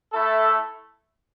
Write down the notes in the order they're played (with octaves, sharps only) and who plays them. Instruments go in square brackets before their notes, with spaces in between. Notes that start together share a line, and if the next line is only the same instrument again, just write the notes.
[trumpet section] A3 E4 A4